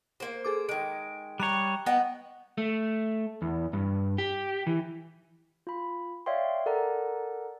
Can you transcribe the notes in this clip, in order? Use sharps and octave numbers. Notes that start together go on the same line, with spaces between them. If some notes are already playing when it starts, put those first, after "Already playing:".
A#3 C5
G#4 A4 D6
D#3 G#3 D7
G3 C#5 G5 A#5 F#6
B3 D#5 F#5 G5
A3
E2
G2
G4
E3
F4 B5
C#5 D5 E5 F5 G5 C6
A4 A#4 D5 F#5 A#5